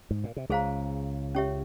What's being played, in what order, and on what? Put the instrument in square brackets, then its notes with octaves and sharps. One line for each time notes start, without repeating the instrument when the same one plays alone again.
[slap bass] G#2
A#2
C3
[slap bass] C#2 C#3 [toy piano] G#4 C5 F5 A#5
[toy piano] C#4 G4 C#5 E5